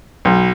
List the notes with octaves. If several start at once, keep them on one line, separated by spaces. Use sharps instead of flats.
B1